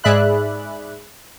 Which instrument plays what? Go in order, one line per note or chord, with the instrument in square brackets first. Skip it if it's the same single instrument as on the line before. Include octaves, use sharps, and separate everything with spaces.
[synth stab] G#2 G#4 D5 E5 B5 F#6